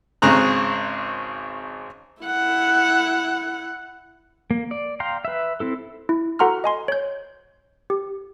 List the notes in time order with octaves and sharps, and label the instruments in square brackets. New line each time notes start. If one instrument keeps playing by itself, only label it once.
[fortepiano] G#1 C#3 G#3 C4 A#5 F#6
[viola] E4 F#5
[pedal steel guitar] A#3
D5
F5 G5 A#5 C6
B4 E5
C4 E4 A4
[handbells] E4
F#4 A4 F#5 A#5 C6 F6
D#5 G#5 C6
C#5 G6
G4